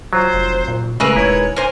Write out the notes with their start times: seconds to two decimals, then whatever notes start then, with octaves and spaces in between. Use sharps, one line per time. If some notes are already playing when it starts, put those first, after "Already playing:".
0.13 F#3 F4 C5
0.34 F1
0.68 A#2
1.00 C#3 G#3 A3 A#4 B4 E6
1.16 D#1 E4 C#5
1.56 A#4 C5 G#5